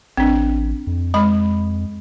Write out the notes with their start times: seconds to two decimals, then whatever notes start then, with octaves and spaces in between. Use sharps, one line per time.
0.17 A1 C4 D4
0.87 F2
1.14 G#3 B5